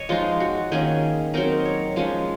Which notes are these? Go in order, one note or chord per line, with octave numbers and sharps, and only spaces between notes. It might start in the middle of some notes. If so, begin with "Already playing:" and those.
Already playing: C#5 D#5
F3 G#3 D#4 F4
F#4
D#3 A#3 C#4 G#4
F#3 C4 D#4 A#4
C#5
F3 G#3 C#4